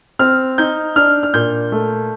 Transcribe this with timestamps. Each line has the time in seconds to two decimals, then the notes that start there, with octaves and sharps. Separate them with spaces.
0.19 C4 F6
0.58 D#4 G6
0.96 D4 F6
1.23 F6
1.34 A#2 G6
1.72 A3